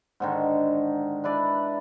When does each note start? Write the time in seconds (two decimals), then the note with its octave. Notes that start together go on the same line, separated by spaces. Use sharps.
0.20 G#2 D3 D#3
1.24 D4 E4 B4 D5